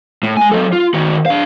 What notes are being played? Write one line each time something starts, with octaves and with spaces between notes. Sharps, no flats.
A2
G#3 G#5
F#3 A4
F4
D#3 F#4
D4 F5